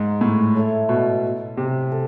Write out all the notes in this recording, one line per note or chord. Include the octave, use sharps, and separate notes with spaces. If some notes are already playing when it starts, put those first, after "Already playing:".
Already playing: G#2 A#3 D#4
A2
E4 A4 C#5
B2
C3
A4